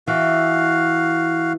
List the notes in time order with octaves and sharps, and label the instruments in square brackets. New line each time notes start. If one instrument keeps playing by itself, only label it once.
[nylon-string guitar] E3 [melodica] F#4 F5